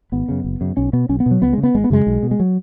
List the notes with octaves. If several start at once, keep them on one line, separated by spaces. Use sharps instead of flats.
G#1 B3
F#2 C#3
F#1
F#2 C#3
B1 C#4
B2 B3
B1 C#4
B3
B2
F#3
C#2 B3
C#3 G#3
B3
G#1 G#3
B3
F#2 C#3 G#3
B1
B2
G#3
F#3